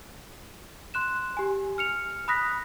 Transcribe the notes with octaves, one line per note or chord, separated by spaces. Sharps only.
C6 F#6 E7
G4 G#5
F6 C#7 F7
B5 D#6 F#6 A#6 B6